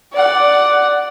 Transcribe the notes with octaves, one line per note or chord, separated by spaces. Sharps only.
D5 F#5